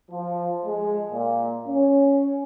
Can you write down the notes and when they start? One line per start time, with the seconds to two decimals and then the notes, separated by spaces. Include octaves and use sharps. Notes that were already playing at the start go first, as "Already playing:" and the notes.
0.11 F3
0.66 G#3
1.11 A#2
1.67 C#4